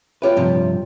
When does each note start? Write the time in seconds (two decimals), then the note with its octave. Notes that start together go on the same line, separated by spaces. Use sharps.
0.22 F4 G4 B4 C#5 E5
0.37 G2 C3 F3